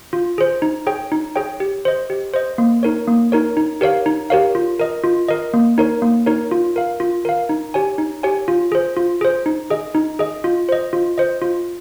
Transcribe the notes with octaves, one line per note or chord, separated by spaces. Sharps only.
F4
G#4 C5
D#4
G#4 C#5 G5
D#4
G#4 C#5 G5
G4
C5 D#5
G4
C5 D#5
A#3
D#4 A#4 C#5
A#3
D#4 A#4 C#5
D#4
G4 A#4 C#5 F5
D#4
G4 A#4 C#5 F5
F4
A#4 D#5
F4
A#4 D#5
A#3
D#4 A#4 C#5
A#3
D#4 A#4 C#5
F4
A#4 F5
F4
A#4 F5
D#4
G4 C#5 G#5
D#4
G4 C#5 G#5
F4
G#4 C5
F4
G#4 C5
D#4
G#4 D#5
D#4
G#4 D#5
F4
C5 D#5
F4
C5 D#5
F4